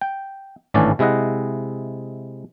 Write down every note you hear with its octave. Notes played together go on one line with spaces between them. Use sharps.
G5
G#1 A2 E3 C#4 D4 A5
C3 G#3 E4 D#5 F#5